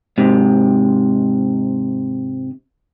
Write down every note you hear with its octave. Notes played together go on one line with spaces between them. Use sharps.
G#2 C3